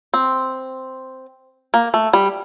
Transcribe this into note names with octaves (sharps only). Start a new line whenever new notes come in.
C4
A#3
A3
G3